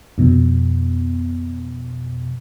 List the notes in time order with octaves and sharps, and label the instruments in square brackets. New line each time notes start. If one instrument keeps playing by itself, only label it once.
[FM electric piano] F2 B2